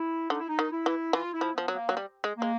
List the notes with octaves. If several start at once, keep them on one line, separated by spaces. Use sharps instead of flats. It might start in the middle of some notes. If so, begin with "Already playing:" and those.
Already playing: E4
D3 D#4
E4
D#4
D#3
E4
E3
E3 F4
E4
F3
F3 B3
F#3
A#3
F#3
G3
G#3
G#3 A#3